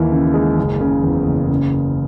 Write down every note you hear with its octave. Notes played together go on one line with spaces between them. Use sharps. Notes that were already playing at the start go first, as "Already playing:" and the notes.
Already playing: D#2 E3
C#3
G#3
F#1
C#3
E2
F#1
C#3